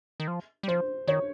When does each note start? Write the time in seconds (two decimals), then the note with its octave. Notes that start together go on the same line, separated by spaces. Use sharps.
0.20 D#3
0.28 F3
0.63 G3
0.68 F3 C5
1.07 D#3 C#5